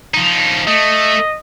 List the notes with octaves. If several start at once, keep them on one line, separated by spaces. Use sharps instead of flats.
F3 D#4
A3 D#5